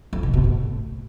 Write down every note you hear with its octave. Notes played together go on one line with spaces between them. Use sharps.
F2
B2
B2
A2